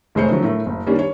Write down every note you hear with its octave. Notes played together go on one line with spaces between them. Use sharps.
F1 G#3 A3 C5 C#5 C#7
D3 F3 F#3
A2 A3 A#4
F#1
D#3 G3 A#3 C#4 D4
C#5